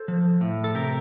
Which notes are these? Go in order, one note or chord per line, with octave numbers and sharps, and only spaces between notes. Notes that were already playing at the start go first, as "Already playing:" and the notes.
Already playing: A4 C5
F3
A2
A4
C3 G4 A#4